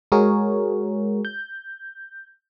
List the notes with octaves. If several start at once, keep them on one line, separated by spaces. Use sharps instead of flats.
G#3 F#4 G#4 A#4 C#5
G6